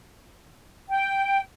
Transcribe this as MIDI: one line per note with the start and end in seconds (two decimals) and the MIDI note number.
0.89 1.40 79